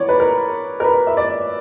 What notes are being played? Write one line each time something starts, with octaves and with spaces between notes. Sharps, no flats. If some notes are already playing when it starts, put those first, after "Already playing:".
Already playing: E3 B3 C#5 D5
B4
A#4
A#4
B4
E5
D5